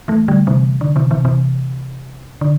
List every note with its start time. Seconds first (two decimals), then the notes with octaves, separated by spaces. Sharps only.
0.08 E3 A3
0.28 D3 G3
0.47 C3 E3
0.81 D3
0.96 C3 E3
1.11 C3 E3
1.25 C3 E3
2.41 D3